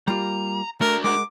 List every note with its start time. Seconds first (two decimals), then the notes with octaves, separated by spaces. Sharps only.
0.08 G3 A#3 F4 A#5
0.81 A3 D4 F#4 A#4
1.04 G#3 A#4 F#5 D6